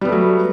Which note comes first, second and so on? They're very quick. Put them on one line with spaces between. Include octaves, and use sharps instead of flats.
G3 B3 A3 F#3